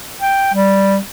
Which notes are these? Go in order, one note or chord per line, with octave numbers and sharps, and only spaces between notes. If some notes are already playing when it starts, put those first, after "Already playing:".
G5
G3